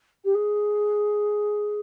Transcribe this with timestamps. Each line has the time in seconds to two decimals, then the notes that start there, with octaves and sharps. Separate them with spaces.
0.24 G4
0.34 G#4